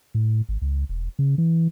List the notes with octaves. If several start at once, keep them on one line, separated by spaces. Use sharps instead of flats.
A2
G#1
C#2
E1
C#3
E3